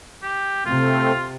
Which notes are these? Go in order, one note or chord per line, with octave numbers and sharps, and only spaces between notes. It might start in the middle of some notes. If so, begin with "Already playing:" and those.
G4
C3 A3 C4 F4